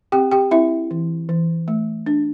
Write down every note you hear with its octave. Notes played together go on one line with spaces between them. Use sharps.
C4 G4 G5
G4 G5
C4 E4 E5
E3
E3
A3
D4